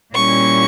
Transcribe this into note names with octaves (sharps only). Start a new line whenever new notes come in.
A#2 G3 A#3 C#4 E4 C#6